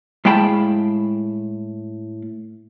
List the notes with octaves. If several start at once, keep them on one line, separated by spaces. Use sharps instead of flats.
A2 G#3 F5 G5 A5 B5